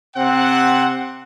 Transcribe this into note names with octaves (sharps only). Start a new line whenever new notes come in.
C3 C4 F#5